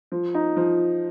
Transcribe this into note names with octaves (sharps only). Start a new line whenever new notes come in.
F3
D#4
F3